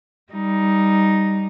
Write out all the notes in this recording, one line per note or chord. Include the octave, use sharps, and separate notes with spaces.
G3 D#4